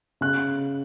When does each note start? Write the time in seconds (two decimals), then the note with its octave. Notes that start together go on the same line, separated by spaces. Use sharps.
0.21 C#3 F#6